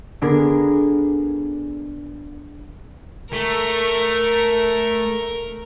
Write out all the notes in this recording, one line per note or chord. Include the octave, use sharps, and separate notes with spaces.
D3 B3 D4 G#4 A#4
A3 A#4